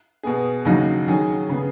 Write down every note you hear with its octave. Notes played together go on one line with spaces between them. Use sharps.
B2 B3 G#4
D#2 C#3 F#3 D#4 F#4
D#3 F#3 C#4 G#4
C#3 B3 G#4